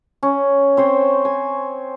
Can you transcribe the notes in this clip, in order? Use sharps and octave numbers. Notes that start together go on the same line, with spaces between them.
C#4
C4 C5 C#5
G#5